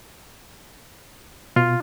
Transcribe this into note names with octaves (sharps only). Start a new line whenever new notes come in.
B2 F4